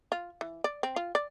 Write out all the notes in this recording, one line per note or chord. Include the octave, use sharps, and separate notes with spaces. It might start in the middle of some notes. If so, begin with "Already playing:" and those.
F4
E3
D5
C4
F4
D5